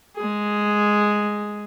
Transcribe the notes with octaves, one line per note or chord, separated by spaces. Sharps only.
G#3 G#4